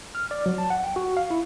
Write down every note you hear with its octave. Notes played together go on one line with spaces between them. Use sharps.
F6
D5
F#3
A5
F#5
G5
F#4
F5
E4